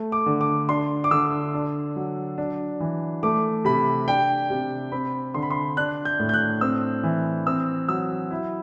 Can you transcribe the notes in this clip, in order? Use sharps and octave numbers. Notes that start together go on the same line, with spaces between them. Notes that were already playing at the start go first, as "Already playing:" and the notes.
Already playing: A3
D6
D3
D6
D4 C6
D6
D3 E6
D4
F#3
D4
E3
A3 D6
C3 B5
D4 G5
C3
C4 B5
D3 C6
B5
C6
D4 F#6
G6
A2
G6
F#6
C4 E6
E3
C4 E6
F#3 E6
E4